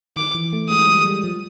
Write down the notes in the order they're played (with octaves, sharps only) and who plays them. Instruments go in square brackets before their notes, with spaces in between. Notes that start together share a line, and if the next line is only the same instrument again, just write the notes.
[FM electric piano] D#3 [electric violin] D6
[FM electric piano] E3
A3
[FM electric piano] G#3 [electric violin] D#6
[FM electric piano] G3
G#3
G3
F3